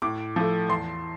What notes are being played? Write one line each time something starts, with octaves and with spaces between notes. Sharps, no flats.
A2 D6
F3 A3
E2 C6